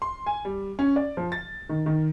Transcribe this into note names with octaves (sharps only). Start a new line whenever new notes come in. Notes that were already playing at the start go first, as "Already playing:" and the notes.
C6
G#5
G3
C#4
D5
F3
A6
D#3
D#3